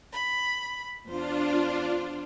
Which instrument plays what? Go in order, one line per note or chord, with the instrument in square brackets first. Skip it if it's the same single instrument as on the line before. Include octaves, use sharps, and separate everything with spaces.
[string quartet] B5
[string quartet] E2 C5 [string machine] D4 F4